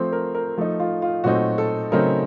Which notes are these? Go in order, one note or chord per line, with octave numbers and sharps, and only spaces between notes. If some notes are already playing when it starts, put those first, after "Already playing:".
Already playing: F3 A3 C4 C5
A#4
A#4
F3 A3 D#4
F4
F4
A#2 F#3 A3 C4 D#4 F#4
A4
C#3 F#3 A3 C4 D#4 A#4